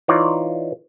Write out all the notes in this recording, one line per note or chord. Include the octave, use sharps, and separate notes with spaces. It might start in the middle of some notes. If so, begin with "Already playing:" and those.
E3 D#4 F4 C#5 D5